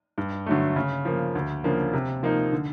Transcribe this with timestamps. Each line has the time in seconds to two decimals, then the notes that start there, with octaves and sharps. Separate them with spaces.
0.18 G2
0.46 D3 F#3 A3
0.76 C#3
1.05 F3 A#3
1.35 D2
1.64 C#3 F3 A#3 D4
1.93 C3
2.23 F3 A#3 D#4
2.52 D3